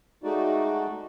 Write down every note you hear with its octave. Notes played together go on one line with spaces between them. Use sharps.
G#3 A3 D#4 F#4 D5